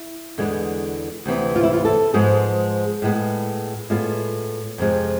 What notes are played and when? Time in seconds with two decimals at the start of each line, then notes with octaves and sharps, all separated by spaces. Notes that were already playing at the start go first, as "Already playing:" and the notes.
Already playing: E4
0.38 E2 D3 G#3 B3
1.26 D2 C3 E3 B3
1.56 F4
1.63 E4
1.73 F4
1.85 A4
2.14 G#2 F3 G#3 B3 G#4
3.02 A2 G#3 B3
3.90 A2 G#3 B3 F4
4.78 F2 C3 F3 G#3